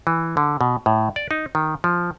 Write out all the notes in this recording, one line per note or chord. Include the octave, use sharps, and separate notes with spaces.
E3
D3
B2
A2
D5
D#4
D#3
F3